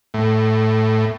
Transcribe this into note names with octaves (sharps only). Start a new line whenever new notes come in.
A2